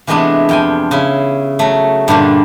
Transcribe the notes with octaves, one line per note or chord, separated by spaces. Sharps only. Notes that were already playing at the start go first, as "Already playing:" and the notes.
C3 E3 G#3 A3 B3 D4
F2 G5 G#5
C#3 E4
F#3 A3
G2 A#2 D3 G3